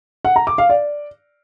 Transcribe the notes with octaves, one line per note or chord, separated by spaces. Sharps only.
F#5
A#5
D6
F5
D5